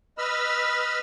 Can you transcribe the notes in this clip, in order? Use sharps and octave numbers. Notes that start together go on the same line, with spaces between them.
B4 D#5 B5 E6 F6